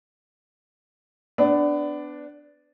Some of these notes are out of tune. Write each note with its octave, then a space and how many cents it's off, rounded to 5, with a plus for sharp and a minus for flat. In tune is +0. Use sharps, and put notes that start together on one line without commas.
B3 +25 D4 +0